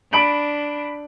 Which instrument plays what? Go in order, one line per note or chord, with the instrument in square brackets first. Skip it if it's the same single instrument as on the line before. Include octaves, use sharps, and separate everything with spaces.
[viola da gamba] D4 [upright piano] B5 D7 F#7